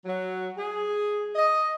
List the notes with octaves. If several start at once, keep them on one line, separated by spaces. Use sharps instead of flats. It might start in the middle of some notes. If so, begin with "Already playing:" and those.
F#3
G#4
D#5